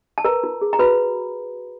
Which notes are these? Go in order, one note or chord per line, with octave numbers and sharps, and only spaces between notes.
A5
A#4 B4 A#5
F4
G#4
A#5
F#4 B4 B5